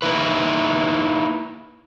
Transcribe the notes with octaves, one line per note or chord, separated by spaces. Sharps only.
A#3 D#4 E4 B4